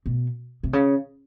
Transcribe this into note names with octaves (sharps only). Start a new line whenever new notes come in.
B2
C3
C#3